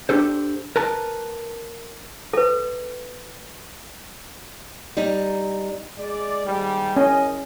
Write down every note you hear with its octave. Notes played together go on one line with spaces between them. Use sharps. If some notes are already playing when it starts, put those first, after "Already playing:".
D4 G4 A4 C5
A#4 B4 A5
A4 B4
G3 D#4
G#3 D5
D#2 G#2 G3
C#4 E4 A#4 D#5